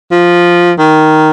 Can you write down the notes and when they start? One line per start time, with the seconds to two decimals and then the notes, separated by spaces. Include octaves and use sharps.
0.11 F3
0.78 D#3